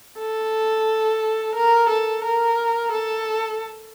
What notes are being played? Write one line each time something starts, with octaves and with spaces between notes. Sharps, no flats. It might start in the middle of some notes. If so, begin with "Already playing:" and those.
A4
A#4
A4
A#4
A4